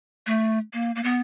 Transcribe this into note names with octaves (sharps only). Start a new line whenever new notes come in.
A3
A#3
A#3
B3